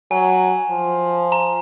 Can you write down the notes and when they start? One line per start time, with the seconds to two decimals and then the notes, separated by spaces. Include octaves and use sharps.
0.11 F#3 G#5
0.71 F3
1.32 A#5